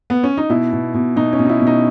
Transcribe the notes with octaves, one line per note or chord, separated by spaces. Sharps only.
B3
C#4
D#4
B2 E4
B2
B2
B2 D#4
C#4
B2
D#4
E4
B2
D#4